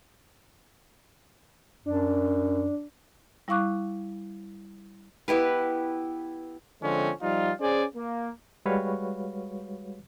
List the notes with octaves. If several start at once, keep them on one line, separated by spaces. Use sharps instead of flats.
F#2 D4
G3 E4 F5 C#6 D6 F#6
B3 E4 G4 B4
D3 F3 G#3 C4 C#4
F3 G3 D#4 F4
C#4 G#4 C5 D5 G#5
A#3
G3 G#3 F#4 B4 C#5 F5